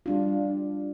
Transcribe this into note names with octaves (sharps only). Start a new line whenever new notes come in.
G3 D4 F4